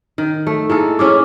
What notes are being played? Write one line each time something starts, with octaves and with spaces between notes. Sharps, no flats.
D#3
A3
A#3 D#4 E4 G#4 A4
C#4 E4 G#4 D6 E6 F6